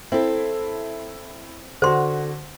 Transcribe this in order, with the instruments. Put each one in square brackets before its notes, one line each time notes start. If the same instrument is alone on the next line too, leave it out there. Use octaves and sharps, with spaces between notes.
[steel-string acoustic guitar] C4 A4 [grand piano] E4
[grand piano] D3 F#4 [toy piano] C5 C6